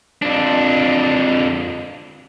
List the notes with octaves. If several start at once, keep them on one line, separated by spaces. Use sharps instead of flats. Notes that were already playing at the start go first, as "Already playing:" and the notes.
F2 D4